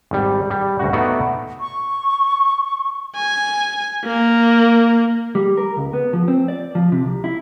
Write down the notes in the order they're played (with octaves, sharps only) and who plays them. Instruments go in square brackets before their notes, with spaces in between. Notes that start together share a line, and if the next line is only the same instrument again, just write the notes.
[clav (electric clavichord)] G#1 G3
G3
D2 G2 F#4
A3 B3 D#4 F#4 D5
[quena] C#6
[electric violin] G#5
A#3
[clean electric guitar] G3
A#4
C#2
B3
F3
C4
D5
F3
C3
C2
E4